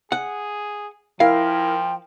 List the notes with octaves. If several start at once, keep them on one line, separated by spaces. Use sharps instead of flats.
G#4 F#5
F3 E4 A#4 F5 G5